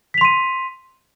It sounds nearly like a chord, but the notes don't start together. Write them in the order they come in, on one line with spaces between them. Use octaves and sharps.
B6 F7 C6 D#7